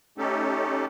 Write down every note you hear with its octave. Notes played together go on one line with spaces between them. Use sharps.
A3 C#4 D#4 G4 A4